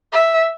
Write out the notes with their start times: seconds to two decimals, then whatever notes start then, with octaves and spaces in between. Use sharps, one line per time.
0.13 E5